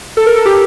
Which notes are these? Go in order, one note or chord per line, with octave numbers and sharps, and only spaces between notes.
A4
A#4
A4
G4